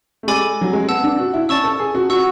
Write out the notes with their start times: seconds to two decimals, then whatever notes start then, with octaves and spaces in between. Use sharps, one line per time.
0.23 A3
0.28 G#3 A4 D5 G#5 B5 D6
0.61 F#3
0.73 G#3
0.88 B3 F#5 A5 E6
1.04 D4
1.19 F#4
1.34 E4
1.49 C#4 D5 A5 C#6 E6
1.64 A4
1.79 G#4
1.95 F#4
2.10 F#4 F#5 C#6 E6